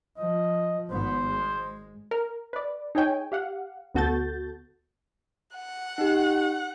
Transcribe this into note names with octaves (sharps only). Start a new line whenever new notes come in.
F3 D#5
G#1 B3 C5
G#3
A#4
B4 D5
D#4 G#4 C#5 G5 G#5
G4 F5 F#5
D2 B3 F#4 A4 G6 A6
F#5
D#4 G4